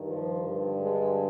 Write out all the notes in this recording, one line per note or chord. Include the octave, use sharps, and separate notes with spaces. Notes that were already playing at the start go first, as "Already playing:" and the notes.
Already playing: G2 D#3
F3
G2 D3
G#3